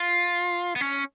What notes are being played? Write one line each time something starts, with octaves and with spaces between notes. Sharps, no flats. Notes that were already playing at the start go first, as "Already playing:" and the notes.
Already playing: F4
B3
C#4